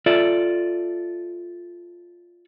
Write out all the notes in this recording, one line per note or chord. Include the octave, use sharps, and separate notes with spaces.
F4 A4 D5 E5